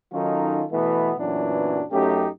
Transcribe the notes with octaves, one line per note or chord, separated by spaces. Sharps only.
D#3 F#3 C#4 D#4 F4 A4
B2 E3 A3 B3
F#2 A#2 E3 F#3 B3 D4
F#2 A3 C#4 D#4 G4